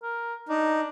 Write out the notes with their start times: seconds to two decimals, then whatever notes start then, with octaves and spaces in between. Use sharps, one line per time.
0.03 A#4
0.49 D4 D#4